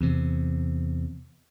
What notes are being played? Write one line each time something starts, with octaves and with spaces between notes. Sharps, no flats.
E2 C3